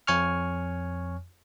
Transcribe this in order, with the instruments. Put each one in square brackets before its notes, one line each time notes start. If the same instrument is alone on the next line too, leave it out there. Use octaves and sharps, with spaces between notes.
[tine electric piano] F2 C#5 G#5 C#6 F6